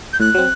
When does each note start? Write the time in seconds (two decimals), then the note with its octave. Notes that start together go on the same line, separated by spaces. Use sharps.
0.13 G6
0.20 A2 F#6
0.34 F#3 C4